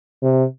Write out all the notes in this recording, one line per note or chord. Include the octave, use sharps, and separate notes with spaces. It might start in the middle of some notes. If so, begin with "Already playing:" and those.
C3